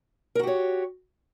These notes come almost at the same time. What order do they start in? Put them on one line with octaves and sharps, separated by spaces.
A#4 F#4 G4 C#5